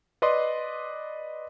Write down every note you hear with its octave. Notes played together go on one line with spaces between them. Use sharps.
B4 D5 D#5 C6